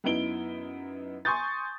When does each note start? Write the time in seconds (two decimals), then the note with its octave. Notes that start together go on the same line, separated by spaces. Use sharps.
0.04 F#2 B3 D#4 E4 D7 G7
1.25 G#5 C6 C#6 D#6 G6 A6